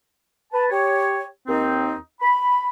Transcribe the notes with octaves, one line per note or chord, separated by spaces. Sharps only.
B4 A5
G4 C#5
D#2 C4 D#4
B5